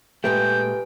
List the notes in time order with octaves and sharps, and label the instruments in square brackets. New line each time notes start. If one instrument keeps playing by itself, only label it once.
[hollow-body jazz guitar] A#2 G#3 A3 [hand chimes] G4 B4 G#5 [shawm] G5